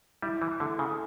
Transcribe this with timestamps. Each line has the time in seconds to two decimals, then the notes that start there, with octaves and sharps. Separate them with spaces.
0.22 G3 E4
0.42 E3
0.60 D3 A3
0.79 C#3